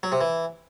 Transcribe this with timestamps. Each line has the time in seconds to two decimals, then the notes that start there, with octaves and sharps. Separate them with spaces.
0.03 F#3
0.12 C3
0.21 E3